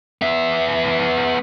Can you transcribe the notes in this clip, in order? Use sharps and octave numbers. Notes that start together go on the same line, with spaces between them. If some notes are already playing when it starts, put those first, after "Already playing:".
B3 E5